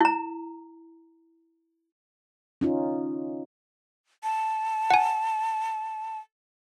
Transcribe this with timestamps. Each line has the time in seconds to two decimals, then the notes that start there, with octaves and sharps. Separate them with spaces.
0.01 E4 A#5
2.61 C#4 D#4 F4
4.23 A5
4.90 F#5 G#5